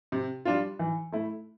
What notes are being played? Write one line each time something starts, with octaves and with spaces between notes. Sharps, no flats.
C3
G3 D4 F4
E3
A3 E4